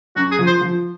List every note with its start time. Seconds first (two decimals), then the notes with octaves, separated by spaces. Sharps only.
0.16 F#2 F#4
0.31 G#4
0.39 F3
0.46 C5
0.61 F3